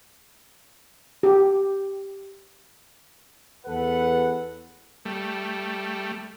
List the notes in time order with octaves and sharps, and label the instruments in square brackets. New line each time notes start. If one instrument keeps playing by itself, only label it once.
[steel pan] G4
[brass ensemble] E2 A4 B4 F#5
[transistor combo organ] G3 A3